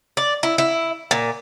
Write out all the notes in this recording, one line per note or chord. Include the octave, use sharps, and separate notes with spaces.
D5
E4
E4
A#2